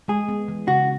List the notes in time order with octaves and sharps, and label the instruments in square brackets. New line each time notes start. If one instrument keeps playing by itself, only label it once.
[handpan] G#3 [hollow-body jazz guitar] G#4
[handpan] B3
E3
[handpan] C#3 [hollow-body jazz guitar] F#4